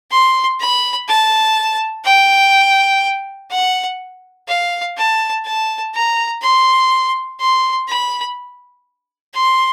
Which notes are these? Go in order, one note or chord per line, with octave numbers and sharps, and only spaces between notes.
C6
B5
A5
G5
F#5
F5
A5
A5
A#5
C6
C6
B5
C6